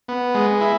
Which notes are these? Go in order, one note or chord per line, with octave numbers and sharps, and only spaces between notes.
B3
G#3
E4